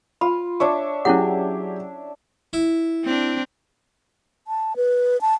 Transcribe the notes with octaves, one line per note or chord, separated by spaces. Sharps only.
F4 B5
D4 C#5 E5 C#6
F#3 C#4 E4 G4 G#4 F#5
E4
C4 D4
A5
B4
A5